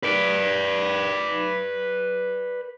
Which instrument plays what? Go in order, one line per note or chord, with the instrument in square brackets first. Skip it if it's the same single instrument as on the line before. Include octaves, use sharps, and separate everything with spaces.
[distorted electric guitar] B4 D5